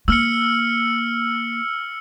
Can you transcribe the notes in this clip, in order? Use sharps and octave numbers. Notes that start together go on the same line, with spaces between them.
A#3 E6 F6 C#7